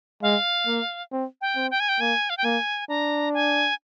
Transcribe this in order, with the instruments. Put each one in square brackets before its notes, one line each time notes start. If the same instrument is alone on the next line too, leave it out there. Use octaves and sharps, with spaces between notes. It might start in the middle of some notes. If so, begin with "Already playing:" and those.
[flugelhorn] G#3 [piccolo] F5
[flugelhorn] A#3
C4
[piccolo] G5
[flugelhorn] C4
[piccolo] G5
G#5
G5
[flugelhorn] A#3 [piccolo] G#5
[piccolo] F5
G5
[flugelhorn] A#3 [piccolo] G#5
[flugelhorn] D4 [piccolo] A#5
[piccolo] G#5